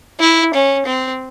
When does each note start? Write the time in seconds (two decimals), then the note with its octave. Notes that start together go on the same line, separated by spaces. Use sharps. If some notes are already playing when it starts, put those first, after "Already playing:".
0.20 E4
0.54 C#4
0.86 C4